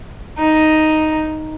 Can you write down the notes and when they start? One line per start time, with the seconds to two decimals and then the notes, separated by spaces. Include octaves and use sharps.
0.39 D#4